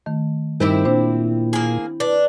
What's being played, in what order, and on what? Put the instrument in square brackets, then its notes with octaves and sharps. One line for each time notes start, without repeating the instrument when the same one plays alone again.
[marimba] D#3 A3
[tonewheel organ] G2 D#3 [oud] C4 E4 G4
[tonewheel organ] A#2 [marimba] D4 C5
[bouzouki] A#3 G#4
[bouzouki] D4 [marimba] B4